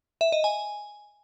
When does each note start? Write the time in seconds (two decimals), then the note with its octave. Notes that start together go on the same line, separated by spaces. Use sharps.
0.21 E5
0.32 D#5
0.44 G#5